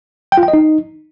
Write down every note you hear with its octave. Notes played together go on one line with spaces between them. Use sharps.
G5
F4
G5
D#5
D#4